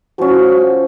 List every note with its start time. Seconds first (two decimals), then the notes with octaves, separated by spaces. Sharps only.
0.19 F3 C#4 F#4